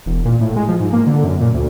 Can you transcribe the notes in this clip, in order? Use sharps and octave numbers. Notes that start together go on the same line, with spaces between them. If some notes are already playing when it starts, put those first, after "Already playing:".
E1
A#2
A2
G#3
F3
G#2
A#3
D3
F#2
A#2
D2